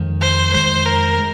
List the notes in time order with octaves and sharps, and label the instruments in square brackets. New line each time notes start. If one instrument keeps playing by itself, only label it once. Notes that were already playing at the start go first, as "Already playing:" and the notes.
Already playing: [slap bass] F2 D#3 G#3
[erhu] C5
[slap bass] F2 D#3 G#3 [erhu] C5
[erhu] A#4
[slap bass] G#3